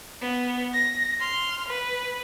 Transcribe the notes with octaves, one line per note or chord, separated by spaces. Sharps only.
B3
A#6
C6 F6
B4